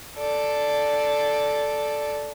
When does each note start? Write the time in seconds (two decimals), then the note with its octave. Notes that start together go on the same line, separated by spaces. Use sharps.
0.18 A4 D5